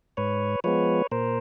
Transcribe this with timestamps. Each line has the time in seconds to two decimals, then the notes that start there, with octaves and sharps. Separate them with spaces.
0.17 G#2 B4 C#5
0.64 F3 G#3 B3 B4 C#5
1.12 A#2 A#4 C5